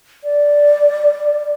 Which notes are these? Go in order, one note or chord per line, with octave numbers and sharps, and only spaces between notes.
D5